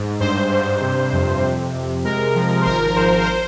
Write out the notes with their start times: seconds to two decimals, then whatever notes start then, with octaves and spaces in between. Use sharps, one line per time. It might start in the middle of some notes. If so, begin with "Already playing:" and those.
Already playing: G#2
0.20 G2 C5
0.51 G2
0.81 C3
1.12 F2
1.43 C3
1.74 C3
2.05 G#3 A#4
2.35 F3
2.61 C5
2.66 G#1 A#4
2.96 G#1 C5
3.20 A#4
3.26 C5